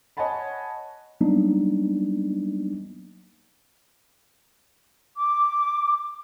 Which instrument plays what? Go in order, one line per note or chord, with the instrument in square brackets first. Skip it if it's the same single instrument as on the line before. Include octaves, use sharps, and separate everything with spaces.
[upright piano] C#5 D#5 F#5 G#5 A5 B5
[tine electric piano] F#3 G3 A#3 B3 D4 D#4
[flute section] D6